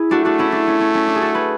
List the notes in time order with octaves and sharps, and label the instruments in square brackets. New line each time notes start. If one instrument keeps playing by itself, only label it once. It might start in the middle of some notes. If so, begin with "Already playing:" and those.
Already playing: [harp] E4 G#4
[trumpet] A3 [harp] D4 F#4
[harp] D4 F#4
C#4 E4
D4
C#4
C#4
C#4
D4
G#4
F#4 A4
G#4 B4